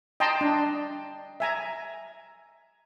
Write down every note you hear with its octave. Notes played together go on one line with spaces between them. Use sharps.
D#5 G5 A5 A#5 C6
D4
E5 G#5 A#5